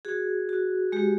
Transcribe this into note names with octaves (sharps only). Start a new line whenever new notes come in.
F#4 G#4
F#4
G#3 G4